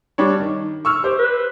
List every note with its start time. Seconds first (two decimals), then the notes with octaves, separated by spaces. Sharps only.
0.18 G3 D4 C#5
0.40 D#3
0.85 C#6 E6 F6
1.04 G4 C5
1.19 B4